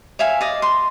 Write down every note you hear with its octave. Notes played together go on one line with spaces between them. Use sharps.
C#5 E5 F5 G#5
D5 D#5
C6